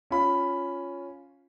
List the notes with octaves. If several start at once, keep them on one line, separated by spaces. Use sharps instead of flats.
C#4 F4 B5